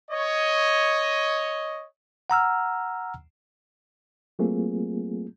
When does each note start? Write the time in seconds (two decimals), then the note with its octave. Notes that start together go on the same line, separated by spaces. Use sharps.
0.11 C#5 D#5
2.30 F#5 A#5 E6 F6
4.39 F#3 A3 A#3 C4 F4 G#4